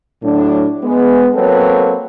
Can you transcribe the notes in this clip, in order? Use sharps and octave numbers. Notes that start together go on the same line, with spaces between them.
A2 F#3 D4
G#3 B3
F#3 A#3 C4 A4 B4 C#5